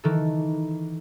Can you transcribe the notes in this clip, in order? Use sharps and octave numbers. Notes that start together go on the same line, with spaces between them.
D#3 E3 A4